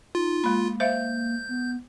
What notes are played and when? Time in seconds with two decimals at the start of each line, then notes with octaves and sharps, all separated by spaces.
0.15 D#4 F4
0.44 G#3 A#3 B5
0.80 C5 E5 F5 G6
1.49 B3